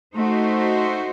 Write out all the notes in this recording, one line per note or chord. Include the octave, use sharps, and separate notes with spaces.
A3 D#4 F#4 C5